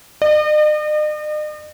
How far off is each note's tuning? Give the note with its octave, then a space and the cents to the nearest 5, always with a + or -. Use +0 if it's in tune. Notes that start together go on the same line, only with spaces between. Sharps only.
D#5 -45